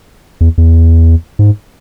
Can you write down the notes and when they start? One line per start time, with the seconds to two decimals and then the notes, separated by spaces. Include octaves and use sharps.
0.41 E2
0.58 E2
1.39 G#2